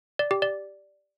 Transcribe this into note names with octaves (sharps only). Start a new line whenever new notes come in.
D5
G4
D5